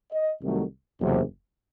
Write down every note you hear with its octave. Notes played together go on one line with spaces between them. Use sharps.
D#5
C2 C3 D#3 F#3 A3
F#1 E2 C3